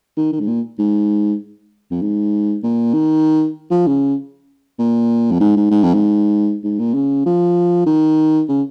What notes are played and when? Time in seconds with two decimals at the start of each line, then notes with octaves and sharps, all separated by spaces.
0.17 D#3
0.32 D#3
0.40 G#2
0.47 A#2
0.79 G#2
1.91 F2
2.02 G#2
2.63 A#2
2.93 D#3
3.71 F3
3.87 C#3
4.79 A#2
5.31 F2
5.40 G#2
5.56 G#2
5.71 G#2
5.83 F2
5.94 G#2
6.64 G#2
6.79 A#2
6.94 C#3
7.26 F3
7.86 D#3
8.48 C#3